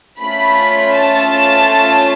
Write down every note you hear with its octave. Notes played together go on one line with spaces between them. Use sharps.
A3 C#4 F4 B5
A5